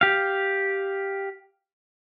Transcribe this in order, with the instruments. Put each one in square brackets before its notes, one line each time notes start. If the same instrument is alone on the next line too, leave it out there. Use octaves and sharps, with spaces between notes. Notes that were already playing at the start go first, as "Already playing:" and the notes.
[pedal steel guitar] G4 F5